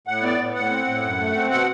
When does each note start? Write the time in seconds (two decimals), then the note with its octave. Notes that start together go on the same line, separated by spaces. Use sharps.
0.07 A2 F#5
0.23 B3 D5
0.39 A2
0.55 A2 F#5
0.71 C4
0.87 A2
1.03 F#2
1.19 A3
1.35 C4
1.50 B2 F#5